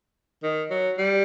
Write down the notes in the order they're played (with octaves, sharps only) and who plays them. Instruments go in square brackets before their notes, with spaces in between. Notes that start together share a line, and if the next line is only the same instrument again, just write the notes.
[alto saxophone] D#3
F#3
G3